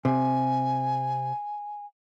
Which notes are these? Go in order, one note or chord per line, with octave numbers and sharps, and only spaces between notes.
C3 G#5